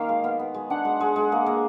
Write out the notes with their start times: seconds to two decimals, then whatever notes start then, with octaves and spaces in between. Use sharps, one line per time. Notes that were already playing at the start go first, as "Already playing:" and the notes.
Already playing: D#3 A#3 F5
0.09 G#3
0.24 B3
0.39 B3
0.54 G#3
0.70 D4 F#5
0.85 G#3
1.00 G#3
1.16 G#3
1.32 A#3
1.46 A#3